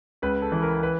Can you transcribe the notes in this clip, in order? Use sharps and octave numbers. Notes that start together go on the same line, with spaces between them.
C#2 B4
A4
E3
A#4
B4